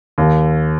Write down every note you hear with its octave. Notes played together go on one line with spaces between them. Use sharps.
D#2